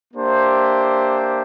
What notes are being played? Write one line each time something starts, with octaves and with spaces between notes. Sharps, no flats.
A#3 D4 G4 C5 E5